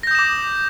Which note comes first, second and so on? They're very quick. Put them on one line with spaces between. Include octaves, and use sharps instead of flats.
A#6 G6 D#6 E7 D6